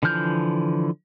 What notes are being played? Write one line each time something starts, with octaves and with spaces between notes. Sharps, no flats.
D3 E3 F3 F6 G6